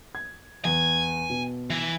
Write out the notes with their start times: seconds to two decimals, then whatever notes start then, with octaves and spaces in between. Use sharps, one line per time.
0.15 G#6
0.65 E2 G#5
1.30 B2
1.70 E3